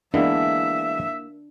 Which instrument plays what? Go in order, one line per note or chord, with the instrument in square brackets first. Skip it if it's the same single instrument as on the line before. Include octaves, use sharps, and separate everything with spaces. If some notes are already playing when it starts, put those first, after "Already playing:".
[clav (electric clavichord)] E3 G#3 B3 [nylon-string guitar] A#3 E4 [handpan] D4 [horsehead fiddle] E5